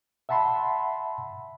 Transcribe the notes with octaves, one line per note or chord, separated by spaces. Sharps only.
E5 F#5 A5 B5 C6